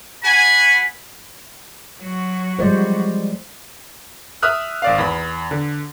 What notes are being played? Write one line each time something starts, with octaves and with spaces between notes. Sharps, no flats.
F#4 F#5 G#5 B5
F#3 F#4
F3 G3 G#3 C5 D5
E5 D#6 F6 F#6
G#1 D5 F5
E2 B5
D3